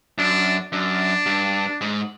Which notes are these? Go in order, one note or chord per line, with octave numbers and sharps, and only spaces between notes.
F#2 D4
F#2 D4
G2
G#2